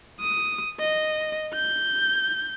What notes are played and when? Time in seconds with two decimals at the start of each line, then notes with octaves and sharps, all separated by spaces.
0.21 D#6
0.80 D#5
1.53 G6